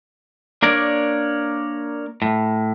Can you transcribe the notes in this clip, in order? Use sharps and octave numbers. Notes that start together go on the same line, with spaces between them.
A#3 D4 A#4 C#5 D5
A2